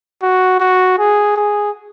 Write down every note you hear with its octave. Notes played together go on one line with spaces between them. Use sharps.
F#4
F#4
G#4
G#4